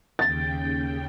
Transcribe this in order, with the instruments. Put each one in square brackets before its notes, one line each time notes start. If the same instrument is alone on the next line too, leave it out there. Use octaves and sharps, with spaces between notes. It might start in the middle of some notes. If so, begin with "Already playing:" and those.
[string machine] D#2 C#3 G5 [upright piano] A6